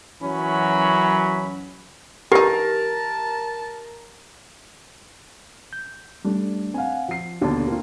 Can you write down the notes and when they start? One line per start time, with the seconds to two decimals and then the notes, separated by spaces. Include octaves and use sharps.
0.21 F#2 E3 F#3 C#4 B5
2.32 E3 D#4 G4 A#4 A5
5.73 G6
6.25 G3 A3 D4
6.74 C4 F5 F#5 G#5
7.08 F3 C7
7.41 D#2 B2 D3 D4 D5 A5
7.67 A#3 C4 F4